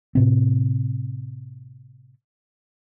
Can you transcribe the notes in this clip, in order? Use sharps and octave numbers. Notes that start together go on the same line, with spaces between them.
A2 C3 C4